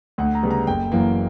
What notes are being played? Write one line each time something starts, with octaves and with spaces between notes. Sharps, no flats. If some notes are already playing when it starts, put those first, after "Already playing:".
D2 F#5
A#5
C#3 G3 B3
A#5
F#1 G5
F#2 E3 A#3